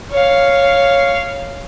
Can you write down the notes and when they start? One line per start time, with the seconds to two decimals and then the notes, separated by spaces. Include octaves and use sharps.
0.11 C#5 F5